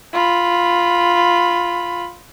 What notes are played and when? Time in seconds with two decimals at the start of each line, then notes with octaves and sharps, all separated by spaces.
0.13 F4 B5